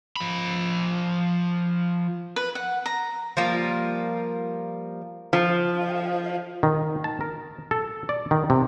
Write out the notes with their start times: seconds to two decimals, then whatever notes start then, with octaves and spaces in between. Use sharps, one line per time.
0.16 F3 B5
2.36 B4
2.55 F#5
2.86 A#5
3.37 F3 G3 A#3
5.33 F3
6.63 D#3
7.04 A5
7.21 A#4
7.71 A4
8.09 D5
8.31 D#3
8.50 C3